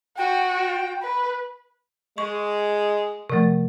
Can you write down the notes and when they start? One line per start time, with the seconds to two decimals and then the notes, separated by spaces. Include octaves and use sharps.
0.17 F#4 G5
1.02 B4
2.18 G#3 C#6
3.30 C3 F3 A3